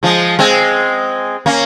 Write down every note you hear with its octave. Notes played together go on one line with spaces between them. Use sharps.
F3 G#3
G#3 C4
A#3 C#4